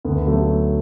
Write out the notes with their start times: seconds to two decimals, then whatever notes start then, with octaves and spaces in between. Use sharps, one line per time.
0.05 D2 B3
0.27 F#3 A3